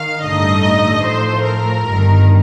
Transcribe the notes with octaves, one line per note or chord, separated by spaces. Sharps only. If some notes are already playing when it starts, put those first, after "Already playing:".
Already playing: D#3 F5
A1 G2 D3 A3 D#4 D#5
A2 F3 A3 C5
A#4
G1 G2 D#3